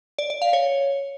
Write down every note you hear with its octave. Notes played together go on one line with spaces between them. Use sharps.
D5
D5
F5
C#5